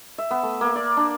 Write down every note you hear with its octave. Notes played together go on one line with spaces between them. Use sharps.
E5
B3
A3
A#3
D5
D4